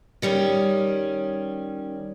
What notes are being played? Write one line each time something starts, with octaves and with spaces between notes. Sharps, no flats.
D#3 G3 C#4